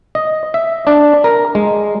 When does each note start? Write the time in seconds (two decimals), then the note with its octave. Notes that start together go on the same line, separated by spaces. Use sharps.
0.15 D#5
0.54 E5
0.87 D4
1.24 A#4
1.55 G#3